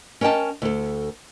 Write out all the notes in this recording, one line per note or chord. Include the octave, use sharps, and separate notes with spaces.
C#4 A#4 D#5 G5 A5
D2 A4